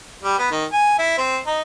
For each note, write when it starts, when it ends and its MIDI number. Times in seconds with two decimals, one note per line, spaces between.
0.24 0.37 55
0.39 0.47 59
0.51 0.64 51
0.73 0.94 80
0.99 1.17 64
1.18 1.38 60
1.46 1.61 63